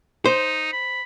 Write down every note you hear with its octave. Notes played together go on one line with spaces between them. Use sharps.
D#4 C5
B5